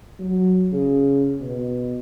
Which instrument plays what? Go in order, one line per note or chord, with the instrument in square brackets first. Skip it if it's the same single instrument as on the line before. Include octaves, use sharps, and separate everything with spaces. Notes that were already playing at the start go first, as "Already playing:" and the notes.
[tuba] F#3
C#3
B2